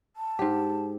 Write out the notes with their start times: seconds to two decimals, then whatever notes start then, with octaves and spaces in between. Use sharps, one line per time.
0.16 A5
0.39 G#2 G4